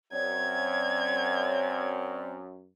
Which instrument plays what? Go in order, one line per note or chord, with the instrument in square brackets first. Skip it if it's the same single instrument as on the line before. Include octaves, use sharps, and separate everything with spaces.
[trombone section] F#2 [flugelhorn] C4 [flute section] C#5 D5 [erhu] G#6